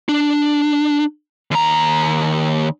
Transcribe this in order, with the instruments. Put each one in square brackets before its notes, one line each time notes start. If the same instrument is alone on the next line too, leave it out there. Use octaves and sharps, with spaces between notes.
[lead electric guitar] D4
D#2 A#5